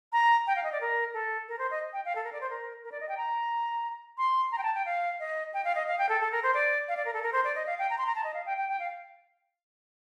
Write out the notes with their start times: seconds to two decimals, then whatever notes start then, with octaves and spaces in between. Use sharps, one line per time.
0.13 A#5
0.47 G5
0.56 F5
0.64 D#5
0.72 D5
0.81 A#4
1.14 A4
1.48 A#4
1.59 C5
1.71 D#5
1.93 G5
2.05 F5
2.15 A4
2.24 A#4
2.32 D5
2.41 C5
2.50 A#4
2.84 A#4
2.92 D5
3.00 D#5
3.09 G5
3.17 A#5
4.18 C6
4.52 A#5
4.58 G5
4.63 A5
4.75 G5
4.85 F5
5.20 D#5
5.53 G5
5.64 F5
5.75 D#5
5.87 F5
5.98 G5
6.09 A4
6.21 A4
6.32 A#4
6.43 C5
6.54 D5
6.88 F5
6.97 D5
7.05 A#4
7.14 A4
7.23 A#4
7.33 C5
7.44 D5
7.55 D#5
7.67 F5
7.79 G5
7.90 A#5
7.98 C6
8.06 A#5
8.15 A5
8.24 D#5
8.34 F5
8.46 G5
8.57 G5
8.69 G5
8.79 F5